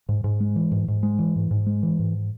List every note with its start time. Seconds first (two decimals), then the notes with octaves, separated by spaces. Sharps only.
0.09 G#2
0.24 G#2
0.40 G#3
0.56 E3
0.72 G#2
0.88 G#2
1.03 G#3
1.19 E3
1.36 G#2
1.51 G#2
1.66 G#3
1.83 E3
1.99 G#2